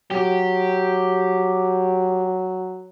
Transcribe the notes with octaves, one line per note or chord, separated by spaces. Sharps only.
F#3 G4